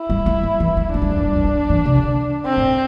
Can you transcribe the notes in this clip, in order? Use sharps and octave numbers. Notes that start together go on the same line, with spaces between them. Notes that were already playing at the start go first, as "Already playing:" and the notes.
Already playing: E4
G3
A3
G3
E3
A3
A3 D4
G3
E3
G3
E3
G3
E3
C3
D3
C4
A2